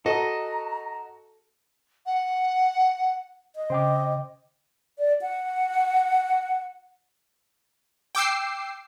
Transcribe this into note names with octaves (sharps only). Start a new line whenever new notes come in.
F#4 A4 D#5 A#5
F#5
D#5
C#3 C5 G5 D6
D5
F#5
G5 D6 E6 C7